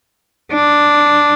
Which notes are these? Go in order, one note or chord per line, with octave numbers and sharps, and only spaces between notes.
D4